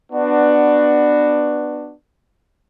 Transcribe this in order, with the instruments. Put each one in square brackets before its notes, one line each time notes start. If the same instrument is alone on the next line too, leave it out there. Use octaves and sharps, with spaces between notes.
[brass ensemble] B3 D4 F#4